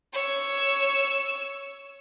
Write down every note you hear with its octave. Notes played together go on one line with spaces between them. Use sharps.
C#5 E6